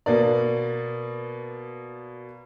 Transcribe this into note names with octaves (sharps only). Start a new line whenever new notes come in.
B2 A#3 D5